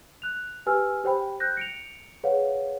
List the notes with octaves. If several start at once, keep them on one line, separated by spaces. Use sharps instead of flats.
F#6 F7
G4 B4 G#5 E6 F6
G4 C5 G5 B5
F#6 G6 A#6
C#7 D7 F7
G#4 B4 C#5 F5 F#5